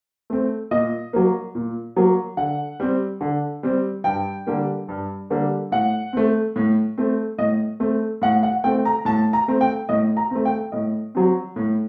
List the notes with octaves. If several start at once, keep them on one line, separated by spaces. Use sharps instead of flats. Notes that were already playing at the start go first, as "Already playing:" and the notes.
A3 C4
A#2 D#5
F#3 A#3
A#2
F#3 A#3
D3 F#5
G3 C4
D3
G3 C4
G2 G5
D3 G3 A#3
G2
D3 G3 A#3
A2 F#5
A3 C4
A2
A3 C4
A2 D#5
A3 C4
A2 F#5
F#5
A3 C4 G5
A#5
A2 A5
A#5
A3 C4
G5
A2 D#5
A#5
A3 C4
G5
A2 D#5
F#3 C4
A2